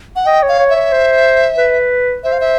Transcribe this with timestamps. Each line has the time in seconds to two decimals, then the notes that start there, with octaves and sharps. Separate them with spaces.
0.16 F#5
0.26 D#5 G5
0.42 C#5
0.49 F5
0.59 C#5
0.70 E5
0.75 C#5
0.92 C5
1.58 B4
2.23 C5 E5
2.32 F5
2.40 E5